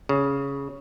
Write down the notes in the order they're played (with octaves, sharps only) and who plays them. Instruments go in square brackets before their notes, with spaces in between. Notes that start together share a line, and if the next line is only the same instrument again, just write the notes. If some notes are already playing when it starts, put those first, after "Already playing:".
[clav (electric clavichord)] C#3